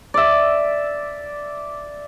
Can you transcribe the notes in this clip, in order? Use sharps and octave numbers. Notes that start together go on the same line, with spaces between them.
D5 E5